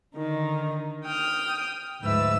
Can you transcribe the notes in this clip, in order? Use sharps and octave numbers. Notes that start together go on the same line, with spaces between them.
D3 D#3 D#4
G5 D#6 F6
D2 G#2 F3 B4 E5 E6